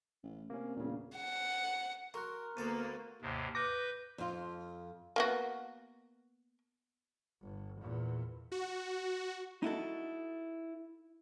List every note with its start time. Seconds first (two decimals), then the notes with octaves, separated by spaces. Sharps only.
0.23 A1
0.50 C3 A#3 C#4
0.76 E1 A#2 C#3
1.17 F#5
2.14 F#4 A#4 C6 C#6 F#6
2.57 D2 A#3 B3 A4 D5 A#5 D#7
3.22 D#2 G#2 C3
3.55 B4 D6 G6 A#6
4.18 F2 F4
5.16 A#3 B3 F#4
7.43 G1
7.82 E2 A#2
8.52 F#4
9.63 D#4 E4 F#4 A4